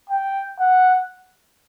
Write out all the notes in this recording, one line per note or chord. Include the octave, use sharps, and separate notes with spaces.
G5
F#5